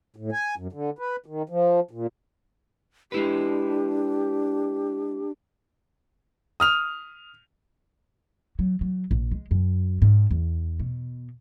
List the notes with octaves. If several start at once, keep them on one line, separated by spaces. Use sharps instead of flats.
A2
G#5
F#2
D3
B4
D#3
F3
A#2
G#3 D4 E4 G4 B4
D#6 F6 F7
F#3
F#3
A#1
G#3
F#2
G#2
E2
B2